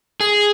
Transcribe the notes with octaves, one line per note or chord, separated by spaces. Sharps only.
G#4